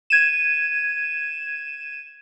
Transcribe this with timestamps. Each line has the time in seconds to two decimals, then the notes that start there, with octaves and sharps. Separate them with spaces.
0.10 G#6 D#7 E7